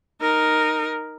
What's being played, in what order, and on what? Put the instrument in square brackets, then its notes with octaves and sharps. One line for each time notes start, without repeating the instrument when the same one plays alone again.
[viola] D#4 A#4